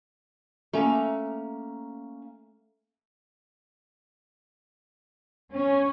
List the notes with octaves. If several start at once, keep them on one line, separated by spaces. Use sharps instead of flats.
A3 A#3 C#4 A#5
C#4